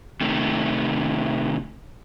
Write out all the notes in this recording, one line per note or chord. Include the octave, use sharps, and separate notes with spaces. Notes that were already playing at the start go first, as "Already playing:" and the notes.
C3 D#3 A3